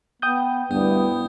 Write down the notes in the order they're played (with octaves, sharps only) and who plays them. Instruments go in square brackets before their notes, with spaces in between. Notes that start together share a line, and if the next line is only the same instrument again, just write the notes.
[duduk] B3 [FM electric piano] G5 D#6 G6
[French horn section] D2 G2 [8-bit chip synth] B3 [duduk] E4